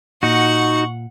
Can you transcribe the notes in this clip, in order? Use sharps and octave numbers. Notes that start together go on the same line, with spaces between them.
A#2 D#4 F#4 F#5 C#6